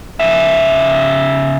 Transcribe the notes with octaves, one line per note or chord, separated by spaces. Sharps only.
C#3 E5